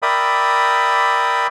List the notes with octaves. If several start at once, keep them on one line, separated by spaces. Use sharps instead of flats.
A#4 D5 E5 G5 B5 D#6